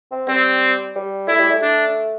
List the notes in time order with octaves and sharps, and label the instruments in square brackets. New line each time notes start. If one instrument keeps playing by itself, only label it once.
[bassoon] C4
[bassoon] G3 [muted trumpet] C4
[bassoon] G3
[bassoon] A3 [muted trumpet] E4
[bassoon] G3
A3
[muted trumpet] D4